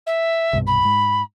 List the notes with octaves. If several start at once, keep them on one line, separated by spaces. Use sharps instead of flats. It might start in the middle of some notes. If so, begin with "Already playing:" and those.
E5
C2 G2 B2
B5
G#2